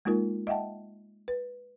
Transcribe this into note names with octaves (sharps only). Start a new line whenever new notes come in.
G#3 A#3 D#4 F4 A#4
D#5 E5 F#5 G5 A5
B4